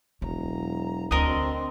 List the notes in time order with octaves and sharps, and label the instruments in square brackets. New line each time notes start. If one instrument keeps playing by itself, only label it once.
[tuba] E1 [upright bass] F#3 [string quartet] A#5
[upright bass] D2 [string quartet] C4 D4 [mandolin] A#4 D#5